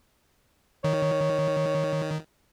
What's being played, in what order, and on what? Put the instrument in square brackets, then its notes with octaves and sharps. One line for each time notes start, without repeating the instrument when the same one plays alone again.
[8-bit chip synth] D#3 [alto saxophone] C#5